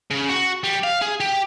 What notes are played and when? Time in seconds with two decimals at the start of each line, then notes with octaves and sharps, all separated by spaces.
0.10 C#3
0.29 F#4
0.64 G3
0.84 F5
1.02 G#4
1.20 G4